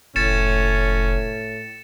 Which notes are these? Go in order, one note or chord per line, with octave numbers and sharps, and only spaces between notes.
F1 A2 C#4 A6 C#7 E7